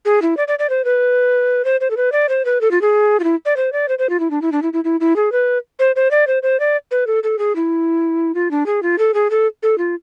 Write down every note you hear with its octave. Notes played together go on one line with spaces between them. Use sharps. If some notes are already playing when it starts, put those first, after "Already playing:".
G#4
E4
D5
D5
D5
C5
B4
C5
C5
A4
B4
D5
C5
B4
A4
F4
G#4
F4
E4
D5
C5
D5
C5
C5
F4
E4
D4
E4
D4
E4
E4
E4
E4
G#4
B4
C5
C5
D5
C5
C5
D5
B4
A4
A4
G#4
E4
F4
D4
G#4
F4
A4
G#4
A4
A4
F4